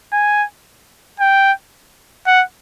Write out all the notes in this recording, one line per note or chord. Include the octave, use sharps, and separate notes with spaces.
G#5
G5
F#5